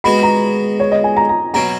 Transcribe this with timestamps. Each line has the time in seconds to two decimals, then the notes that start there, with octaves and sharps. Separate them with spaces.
0.04 G#3 B3 F#4 B5
0.23 A#5
0.80 C#5
0.92 D#5
1.04 G#5
1.17 A#5
1.29 A#5
1.54 B2 F#3 C#4 A#5